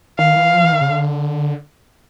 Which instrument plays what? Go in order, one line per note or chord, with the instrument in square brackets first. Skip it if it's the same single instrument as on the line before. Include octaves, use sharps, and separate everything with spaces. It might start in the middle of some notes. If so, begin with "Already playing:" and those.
[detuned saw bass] D#3 [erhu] F5
[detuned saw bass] E3
F3
E3
D#3
C#3
D3